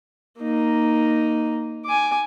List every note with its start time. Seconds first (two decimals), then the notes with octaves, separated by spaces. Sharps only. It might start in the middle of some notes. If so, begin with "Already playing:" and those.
0.39 A#3 D#4
1.85 G#5 D6